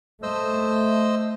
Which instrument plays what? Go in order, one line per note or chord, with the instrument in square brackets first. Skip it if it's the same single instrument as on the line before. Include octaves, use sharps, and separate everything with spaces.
[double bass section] A3 [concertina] C5 D#5 E6